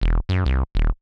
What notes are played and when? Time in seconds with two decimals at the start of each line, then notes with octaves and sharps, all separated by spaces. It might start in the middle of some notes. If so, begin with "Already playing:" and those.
0.01 E1
0.29 F#2
0.45 C2
0.75 D#1